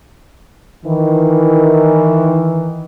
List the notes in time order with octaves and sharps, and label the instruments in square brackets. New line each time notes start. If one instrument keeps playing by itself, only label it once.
[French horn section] D#3 E3